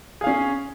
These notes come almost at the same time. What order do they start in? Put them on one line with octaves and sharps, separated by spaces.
G#4 F5 C#4